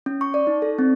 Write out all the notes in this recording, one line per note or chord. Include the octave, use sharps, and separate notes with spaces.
C#4
C#6
D5
D#4
A4
C4